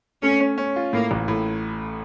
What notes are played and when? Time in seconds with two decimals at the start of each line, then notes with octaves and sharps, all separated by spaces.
0.23 A3 C#4
0.40 C#4
0.58 C#4
0.76 F4
0.93 A2 A#3
1.11 A1
1.28 A2